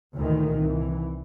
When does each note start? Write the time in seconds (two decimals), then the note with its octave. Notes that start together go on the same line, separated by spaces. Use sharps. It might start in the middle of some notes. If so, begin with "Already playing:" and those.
0.17 D2 G2 A#2 D#3 E3
0.55 C2 E3